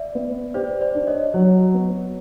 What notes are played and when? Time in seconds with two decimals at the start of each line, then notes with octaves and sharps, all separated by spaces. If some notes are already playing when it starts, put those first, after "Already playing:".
Already playing: D5 E5
0.15 B3
0.54 G4 C5 D5
0.81 C5 D5
0.95 D4
1.07 C#5 D#5
1.34 F#3 C#5
1.74 B3